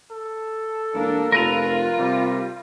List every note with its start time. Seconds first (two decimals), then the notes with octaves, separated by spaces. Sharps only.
0.11 A4
0.94 E1 A#3 D4
1.32 F1 F4 A#4 B4 A#5
1.98 C3 G3